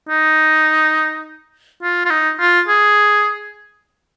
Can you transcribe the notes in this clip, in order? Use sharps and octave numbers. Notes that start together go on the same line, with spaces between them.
D#4
F4
F4
D#4
F4
G#4